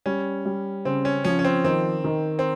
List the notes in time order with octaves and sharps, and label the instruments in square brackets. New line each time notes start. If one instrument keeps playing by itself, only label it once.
[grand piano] G3 [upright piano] C#4
[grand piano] G3
[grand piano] C#3 [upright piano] C4
[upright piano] C#4
[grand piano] F3 [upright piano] C#4
[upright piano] C#4
C4
[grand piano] D#3 [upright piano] C4
[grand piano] D#3
[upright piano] C4